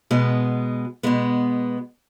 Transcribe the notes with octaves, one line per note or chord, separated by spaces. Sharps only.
B2 G#3 B3
B2 G#3 B3